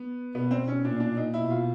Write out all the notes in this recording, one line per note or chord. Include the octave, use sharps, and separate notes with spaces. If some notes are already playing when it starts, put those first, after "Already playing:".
Already playing: B3
B2 B3
C4
C#4
A#2 D4
D4
D#4
B2 E4
F4